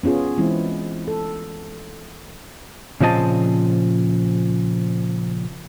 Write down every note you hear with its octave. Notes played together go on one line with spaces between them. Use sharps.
B3 C#4 F4 G#4
E3 G#3 C4 E4
A4
A#2 C#3 F3 C4 D#5 A5